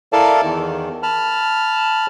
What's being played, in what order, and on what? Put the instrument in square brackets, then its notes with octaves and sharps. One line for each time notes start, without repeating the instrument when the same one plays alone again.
[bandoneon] E4 A4 A#4 D5 F5 A5
E2 D#3
A5 B5 F6